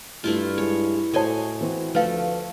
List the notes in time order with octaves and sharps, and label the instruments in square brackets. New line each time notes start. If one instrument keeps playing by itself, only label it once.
[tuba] G2 [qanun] A3 E4 F4
[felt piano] G#3 [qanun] C#5
[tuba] A2 [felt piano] F#4 C5 [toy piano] A4 A5 [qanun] C#5 D#5 G#5
[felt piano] E3 C4 F#4
[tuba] D2 [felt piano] F3 [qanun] A3 A4 [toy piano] B4 F5